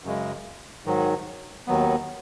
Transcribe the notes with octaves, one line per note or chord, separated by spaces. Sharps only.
F#2 C#3 G#3
G#2 D#3 F#3
D#2 D#3 F#3 B3